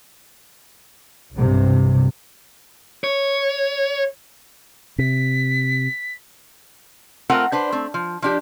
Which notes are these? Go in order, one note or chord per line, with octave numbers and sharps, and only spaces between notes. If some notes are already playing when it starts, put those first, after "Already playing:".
B1 G2 C3
C#5
C3 B6
A3 C4 F4 A#4 F#5 G5
D4 B4 C5
A3 C4
F3
F3 D4 G4